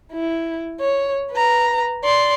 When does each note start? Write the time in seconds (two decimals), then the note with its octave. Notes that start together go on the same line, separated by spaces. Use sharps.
0.12 E4
0.80 C#5
1.32 B4 A#5
2.03 D5 C6